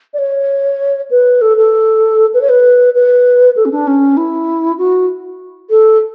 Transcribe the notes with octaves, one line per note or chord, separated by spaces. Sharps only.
D5
C#5
B4
A4
A4
B4
C#5
B4
B4
A4
C#4
D4
C#4
E4
F#4
A4